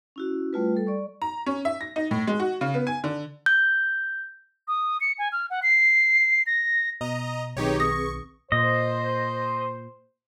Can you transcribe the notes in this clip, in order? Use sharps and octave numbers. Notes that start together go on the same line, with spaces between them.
C#4 E4 F#4
G3 A3 F4 B4
G3 A4
D5 C#6
A#5
C#4
E5
A#6
D#4
A2
G#3
F#4
C#3
B3
G#5
D3
G6
D#6
C#7
G#5
F6
F#5
C7
A#6
B2 D#5 A#5
B1 D#3 C4 D#4 G4 G#4 B4 C#5
C#6 D#6 A#6
A#2 C5 D#5